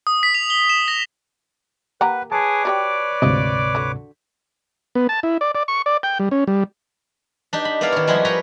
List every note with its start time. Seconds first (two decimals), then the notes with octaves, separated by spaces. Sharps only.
0.07 D#6
0.23 B6
0.35 F7
0.50 G7
0.69 E7
0.88 A#6
2.01 A#3 G4 B4 F#5 A#5
2.32 G#4 B4 C#5 A5 D6
2.65 F#4 G4 D5 G5
3.22 D2 G#2 C3 F4 D#5
3.75 D3 F#4
4.95 B3
5.09 A5
5.23 E4
5.41 D5
5.55 D5
5.68 C#6
5.86 D5
6.03 G5
6.19 G3
6.31 C#4
6.47 G3
7.53 D4 D#4 G4
7.65 B5
7.81 A#3 B3 E4 A#4 D5 F5
7.92 D#3 C#5
8.07 F3 G3 G#3 E4 F#4 G#4
8.25 A#4 B4 C#5 G5 A#5